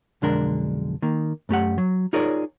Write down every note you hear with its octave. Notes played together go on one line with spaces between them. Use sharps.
B1 F2 D3 G#3 D4 A#4
D#3 A#3
F#2 A3 G4 F#5
F#3
D#4 F4 G#4 A#4 C#5 D5